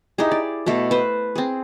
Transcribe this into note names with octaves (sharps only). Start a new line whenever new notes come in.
D#4 E4 G4 G#4
D5
B2 A3 A4
B4 C5
C4 G#4